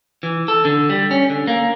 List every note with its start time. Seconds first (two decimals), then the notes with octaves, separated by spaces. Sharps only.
0.23 E3
0.48 A4
0.65 D3
0.90 G3
1.11 C#4
1.30 D3
1.47 A#3